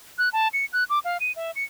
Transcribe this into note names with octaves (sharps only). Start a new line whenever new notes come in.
F#6
A5
C#7
F#6
D6
F5
D#7
E5
C#7